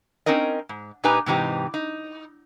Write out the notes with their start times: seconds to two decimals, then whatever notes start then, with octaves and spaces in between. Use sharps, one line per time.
0.26 C4 C#4 D#4 A#4 D#5
0.69 G#2
1.04 A#2 D#4 G4 B4 G#5 A#5
1.26 G#2 C3 E3 D#4 G4
1.74 D#4